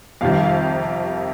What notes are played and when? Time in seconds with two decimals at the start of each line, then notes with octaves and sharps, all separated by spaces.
0.21 F2 C3 D#3 G3 F5
0.33 F5
0.45 F5